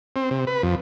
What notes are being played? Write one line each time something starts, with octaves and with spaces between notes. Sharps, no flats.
C4
C3
B4
F2